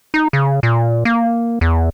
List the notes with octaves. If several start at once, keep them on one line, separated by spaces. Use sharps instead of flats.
D#4
C#3
A#2
A#3
E2